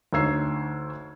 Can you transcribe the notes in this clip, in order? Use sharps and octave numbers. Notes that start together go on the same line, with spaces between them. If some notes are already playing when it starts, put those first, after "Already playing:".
D2 D#4 C#5 E6 G#6 C7